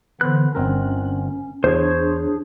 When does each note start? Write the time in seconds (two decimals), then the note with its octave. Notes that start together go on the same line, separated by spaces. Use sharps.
0.21 D3 E3 B3 B4 C5 F#6
0.55 G1 C4 C#4 A#4
1.64 E2 D4 G#4 C5 C#5